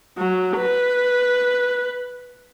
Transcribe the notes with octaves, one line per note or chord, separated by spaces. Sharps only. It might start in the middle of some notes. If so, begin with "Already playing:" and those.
F#3
B4